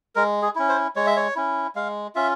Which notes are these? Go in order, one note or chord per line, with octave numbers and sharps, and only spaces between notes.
G#3 A#4
G#4
C#4 E4
C5
G#3 C#5
E5
C#5
C#4 E4
G#3 F5
C#4 F4 E5